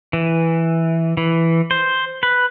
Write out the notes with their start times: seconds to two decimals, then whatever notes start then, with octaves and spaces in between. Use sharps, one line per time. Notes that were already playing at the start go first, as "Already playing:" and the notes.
0.13 E3
1.17 E3
1.71 C5
2.23 B4